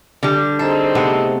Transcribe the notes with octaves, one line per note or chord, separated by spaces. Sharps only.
D3 G3
C4 D#4 G#4 A4 C5
C3 A3 B3